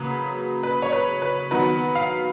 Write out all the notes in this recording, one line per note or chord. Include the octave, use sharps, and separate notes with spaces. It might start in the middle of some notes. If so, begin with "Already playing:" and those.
Already playing: C#3 F#3 A#3 B4
B4
C#5
B4
B4
D#3 F#3 B3 B4
F5